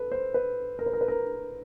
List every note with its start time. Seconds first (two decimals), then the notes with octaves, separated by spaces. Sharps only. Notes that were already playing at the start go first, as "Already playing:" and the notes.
Already playing: A4 B4
0.12 C5
0.34 B4
0.79 A#4
0.86 B4
0.93 A#4
1.01 B4
1.08 A#4